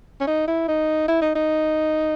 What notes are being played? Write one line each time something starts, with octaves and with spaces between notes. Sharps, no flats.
C#4
D#4
E4
D#4
E4
D#4
D#4